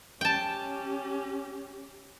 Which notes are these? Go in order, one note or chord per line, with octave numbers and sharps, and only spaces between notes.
C#4 G4 G5 A5